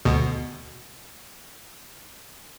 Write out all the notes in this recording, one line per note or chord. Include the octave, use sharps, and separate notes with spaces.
D2 B2